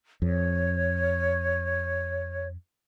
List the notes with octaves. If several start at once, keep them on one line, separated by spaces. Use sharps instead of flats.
F2 C#5